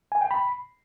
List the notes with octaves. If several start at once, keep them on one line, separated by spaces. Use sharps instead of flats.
G#5
G5
B5